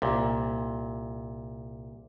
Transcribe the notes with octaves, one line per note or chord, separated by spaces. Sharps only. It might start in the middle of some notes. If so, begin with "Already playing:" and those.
C2 A#2